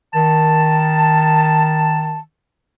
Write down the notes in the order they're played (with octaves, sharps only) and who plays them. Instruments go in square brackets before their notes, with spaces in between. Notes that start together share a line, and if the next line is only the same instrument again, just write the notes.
[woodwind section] D#3 A5